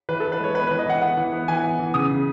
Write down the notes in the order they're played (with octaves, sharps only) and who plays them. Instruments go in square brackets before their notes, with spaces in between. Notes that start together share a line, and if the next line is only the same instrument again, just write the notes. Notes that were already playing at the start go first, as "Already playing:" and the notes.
[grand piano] E3 B4
A4
E3
B4
G#3 C#5
B3 B4
B4
E3
D#5
E3 F#5
B3 F#5
E3
B3
E3 G#5
B3
E3
C#3 D#6
C#3